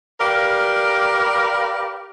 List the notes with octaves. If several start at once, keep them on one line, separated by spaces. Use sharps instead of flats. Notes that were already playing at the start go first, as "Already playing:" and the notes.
G4 A#4 B4 D5 F5